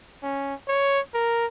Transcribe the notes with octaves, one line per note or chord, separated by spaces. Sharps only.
C#4
C#5
A#4